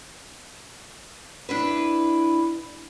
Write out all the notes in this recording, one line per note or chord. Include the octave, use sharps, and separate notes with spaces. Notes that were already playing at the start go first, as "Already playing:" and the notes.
D4 E4 B4